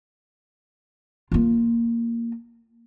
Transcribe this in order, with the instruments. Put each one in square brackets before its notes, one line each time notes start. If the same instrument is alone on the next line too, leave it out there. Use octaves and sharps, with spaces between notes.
[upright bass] A#3 F4